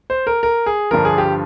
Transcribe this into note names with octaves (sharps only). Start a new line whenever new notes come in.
C5
A#4
A#4
G#4
G2 D3 F3 A#4
G#4
G4